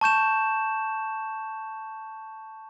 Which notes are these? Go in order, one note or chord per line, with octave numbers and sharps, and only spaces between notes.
A5 C#6 G6 E7